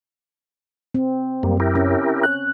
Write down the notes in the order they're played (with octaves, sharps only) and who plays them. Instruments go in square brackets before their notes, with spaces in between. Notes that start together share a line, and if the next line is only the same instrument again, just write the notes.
[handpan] C4
[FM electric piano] F#2 [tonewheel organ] G3 A#3
[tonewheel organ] E4 G4 A#4
[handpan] C#4
[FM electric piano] F#6